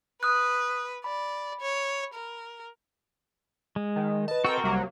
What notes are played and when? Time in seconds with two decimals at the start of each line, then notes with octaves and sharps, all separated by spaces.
0.23 B4 D#6 F#6
1.04 D5 B5
1.61 C#5
2.14 A#4
3.76 G#3
3.96 D#3
4.28 B4 D#5 A5
4.45 C4 F#4 A4 A#4 G5
4.64 C2 C3 F#3 G3 A#3